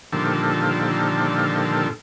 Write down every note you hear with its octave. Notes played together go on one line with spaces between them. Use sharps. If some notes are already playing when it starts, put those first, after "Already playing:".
A#2 D3 D#3 F3 G3 A4